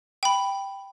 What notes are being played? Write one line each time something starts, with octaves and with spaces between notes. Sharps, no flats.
G5 B5